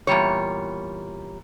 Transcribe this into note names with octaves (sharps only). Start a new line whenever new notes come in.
E2 A#2 G3 C#5